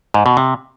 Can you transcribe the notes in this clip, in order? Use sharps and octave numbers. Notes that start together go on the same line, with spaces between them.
G#2
B2
C3